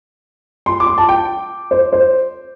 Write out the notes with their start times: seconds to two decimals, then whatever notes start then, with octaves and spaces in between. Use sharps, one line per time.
0.66 C6
0.80 D6
0.87 C6
0.98 A5
1.09 G5
1.71 C5
1.93 C5